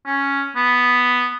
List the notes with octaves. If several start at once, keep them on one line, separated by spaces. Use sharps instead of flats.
C#4
B3